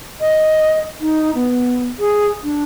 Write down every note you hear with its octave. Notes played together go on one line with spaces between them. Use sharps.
D#5
D#4
B3
G#4
D4